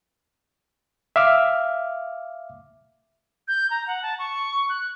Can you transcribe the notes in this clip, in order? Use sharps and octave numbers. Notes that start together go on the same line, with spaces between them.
E5 F5 D6 F6
G6
A#5
F#5
A5
C#6
F#6